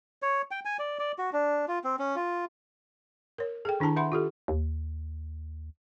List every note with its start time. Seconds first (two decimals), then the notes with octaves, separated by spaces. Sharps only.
0.22 C#5
0.51 G5
0.65 G#5
0.79 D5
0.99 D5
1.18 F#4
1.33 D4
1.68 F4
1.84 C4
1.99 C#4
2.16 F4
3.38 A#4 C#5
3.65 G#4 A4 G5
3.80 D#3 D4 E4 A5 A#5
3.96 B4 E5 F#5 B5 C6
4.12 F4 G4 A4
4.48 D#2